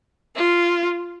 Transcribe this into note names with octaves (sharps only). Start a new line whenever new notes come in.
F4